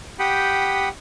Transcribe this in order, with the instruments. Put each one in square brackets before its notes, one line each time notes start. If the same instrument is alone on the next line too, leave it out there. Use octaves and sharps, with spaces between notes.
[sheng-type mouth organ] G4 F#5 G5 B5 D#6